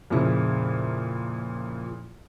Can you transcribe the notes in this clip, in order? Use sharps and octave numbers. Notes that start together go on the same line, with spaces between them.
F2 A#2 C#3 E4